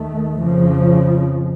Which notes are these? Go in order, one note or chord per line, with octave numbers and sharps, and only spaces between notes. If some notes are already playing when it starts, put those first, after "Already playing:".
Already playing: D#2 D#3 A3
F2 C#3 F3